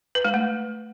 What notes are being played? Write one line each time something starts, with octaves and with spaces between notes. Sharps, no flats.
B4
G#3
A3